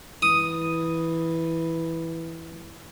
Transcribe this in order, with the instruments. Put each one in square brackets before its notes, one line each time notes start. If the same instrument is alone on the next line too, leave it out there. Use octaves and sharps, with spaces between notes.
[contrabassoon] E3 [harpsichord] D#6